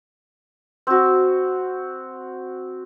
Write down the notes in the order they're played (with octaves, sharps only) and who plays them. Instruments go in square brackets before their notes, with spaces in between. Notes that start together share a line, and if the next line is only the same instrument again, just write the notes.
[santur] C4 F#4